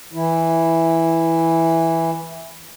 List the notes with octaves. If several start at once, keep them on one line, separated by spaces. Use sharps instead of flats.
E3 E4